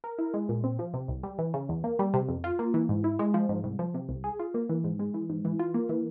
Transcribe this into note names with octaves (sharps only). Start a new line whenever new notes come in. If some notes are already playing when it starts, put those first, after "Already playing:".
A#4
E4
G#3
A#2
C4
F3
C3
C2
G3
E3
C#3
E2
A#3
G3
C3
F2
F4
A#3
E3
G#2
E4
G#3
F3
G#2
C2
F3
C3
C2
G#4
F4
A#3
E3
G#2
G#3
E3
G#2
E3
F4
A#3
E3